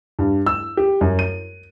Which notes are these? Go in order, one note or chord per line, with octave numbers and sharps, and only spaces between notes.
G2
E6
G4
F#2
D#7